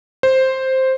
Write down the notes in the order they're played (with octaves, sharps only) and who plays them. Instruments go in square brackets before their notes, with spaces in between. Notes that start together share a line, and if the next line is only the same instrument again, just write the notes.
[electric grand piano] C5